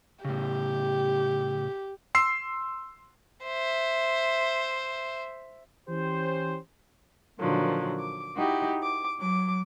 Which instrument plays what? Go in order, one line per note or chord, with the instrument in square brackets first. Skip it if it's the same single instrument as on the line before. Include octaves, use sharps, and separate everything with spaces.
[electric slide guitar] A2 C#3 [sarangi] G4
[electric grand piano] C6 E6 C7
[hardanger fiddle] C5 E5
[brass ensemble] E3 C#4 G4 C5
[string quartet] A#2 D3 D#3 F3 F#3
D6
D#4 E4 F#4 G4
D6
F#3 D6